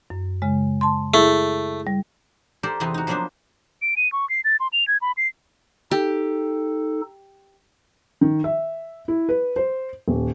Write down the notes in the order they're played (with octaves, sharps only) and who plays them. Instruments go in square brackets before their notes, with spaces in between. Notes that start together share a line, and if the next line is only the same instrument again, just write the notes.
[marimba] F#2
C#3 G#3
A5 C6
[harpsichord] A3 [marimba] E4 G#4
[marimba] G3
[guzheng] G4 A4 A#4 C5 D5
E2 C3 B3 C4 D#5
D#4 F#4
F3 F#3 A#3 B3 D4 C5
[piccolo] D7
D#7
C#6
C7
A6
C6
F7
G#6
B5
C7
[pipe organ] D#4 A4 [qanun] G4
[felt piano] D#3
E5
E4
B4
C5
D#1